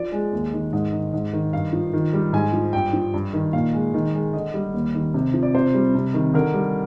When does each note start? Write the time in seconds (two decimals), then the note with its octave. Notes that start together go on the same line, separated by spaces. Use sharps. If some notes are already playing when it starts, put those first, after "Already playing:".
Already playing: F3 D5
0.12 G#3
0.33 D#2
0.53 D#3
0.73 G#2 D#5
0.92 D#3
1.13 G#2
1.33 D#3
1.53 G2 F5
1.73 F3
1.93 D#3
2.13 G3
2.33 G#2 G#5
2.53 F3
2.73 G2 G5
2.93 F3
3.14 G2
3.33 D#3
3.53 A#2 F5
3.74 G#3
3.94 D#3
4.13 G#3
4.33 D3 D#5
4.54 G3
4.74 D#2
4.94 D#3
5.14 C3
5.34 F3
5.43 D5
5.54 C3 C5
5.74 G3
5.95 C3
6.14 D#3
6.34 D3 A#4
6.54 G3